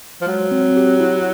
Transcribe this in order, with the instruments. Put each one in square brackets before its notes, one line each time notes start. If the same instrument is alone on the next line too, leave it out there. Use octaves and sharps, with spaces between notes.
[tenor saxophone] F3
[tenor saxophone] F#3 [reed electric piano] G#3
[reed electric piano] C4
G4
E4